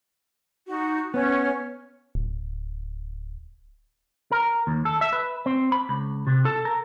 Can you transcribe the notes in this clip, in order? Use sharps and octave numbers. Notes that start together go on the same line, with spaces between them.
D#4 F#4
B3 C#4 C#5
D1
A#4
D#2
A4
E5
B4
C4
B5
C#2
C3
A4
A#4